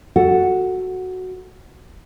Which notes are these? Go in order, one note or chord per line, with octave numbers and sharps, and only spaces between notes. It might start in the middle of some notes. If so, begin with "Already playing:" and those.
F#4 A4 F#5